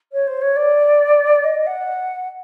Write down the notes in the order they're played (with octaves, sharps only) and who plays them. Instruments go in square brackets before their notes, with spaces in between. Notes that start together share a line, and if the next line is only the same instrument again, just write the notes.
[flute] C#5
C5
C#5
D5
D#5
F#5